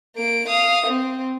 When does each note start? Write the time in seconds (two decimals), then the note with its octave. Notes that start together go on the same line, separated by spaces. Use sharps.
0.16 A#3 D7
0.48 F5 D#6
0.87 C4